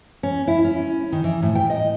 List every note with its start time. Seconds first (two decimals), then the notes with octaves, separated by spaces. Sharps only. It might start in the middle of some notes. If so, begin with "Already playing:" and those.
0.23 C#4
0.48 E4
0.64 C#4
1.12 D#3
1.24 E3
1.43 A2
1.55 G5
1.70 D#5